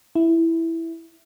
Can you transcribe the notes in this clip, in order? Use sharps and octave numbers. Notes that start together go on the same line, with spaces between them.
E4